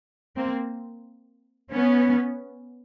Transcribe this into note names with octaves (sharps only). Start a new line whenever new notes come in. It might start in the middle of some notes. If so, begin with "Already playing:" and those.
A#3 C4
B3 C#4